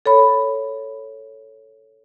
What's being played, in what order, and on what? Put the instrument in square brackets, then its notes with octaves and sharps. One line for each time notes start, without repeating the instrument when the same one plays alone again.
[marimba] A4 C#5 B5